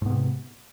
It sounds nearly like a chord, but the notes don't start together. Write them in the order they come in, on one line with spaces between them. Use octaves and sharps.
G#2 B3 C3